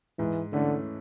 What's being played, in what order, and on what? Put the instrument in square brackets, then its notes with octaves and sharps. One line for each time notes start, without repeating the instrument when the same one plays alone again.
[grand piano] G#2 [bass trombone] E3
[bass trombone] D3 [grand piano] E3 A3 C#4